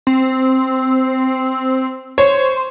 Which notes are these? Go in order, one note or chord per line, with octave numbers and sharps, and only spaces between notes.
C4
C5 C#5